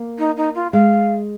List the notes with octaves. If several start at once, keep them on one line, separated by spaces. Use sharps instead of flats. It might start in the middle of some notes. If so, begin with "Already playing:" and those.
Already playing: A#3
D#4
D#4
F4
G#3 F5